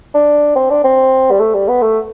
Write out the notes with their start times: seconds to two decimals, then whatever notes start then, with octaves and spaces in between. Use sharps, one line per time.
0.14 D4
0.56 C4
0.70 D4
0.84 C4
1.31 G3
1.40 A3
1.54 G3
1.68 B3
1.82 A3